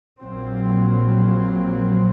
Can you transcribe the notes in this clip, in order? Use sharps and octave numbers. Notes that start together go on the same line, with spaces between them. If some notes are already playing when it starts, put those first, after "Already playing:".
A#1 A#2 F#3 C4